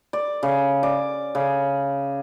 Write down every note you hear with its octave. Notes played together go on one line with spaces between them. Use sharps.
D5
C#3
D5
C#3